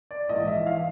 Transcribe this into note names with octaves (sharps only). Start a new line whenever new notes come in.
D5
A#1 G#2 E3 D#5
E5
E3 F5